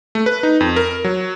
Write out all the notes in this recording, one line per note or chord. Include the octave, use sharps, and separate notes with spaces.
A3
B4
D#4
F2
A#4
F#3